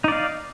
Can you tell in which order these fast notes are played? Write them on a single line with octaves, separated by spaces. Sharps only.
D#4 D5 F5